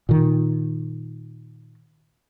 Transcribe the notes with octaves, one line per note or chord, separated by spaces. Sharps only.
A#2 D#3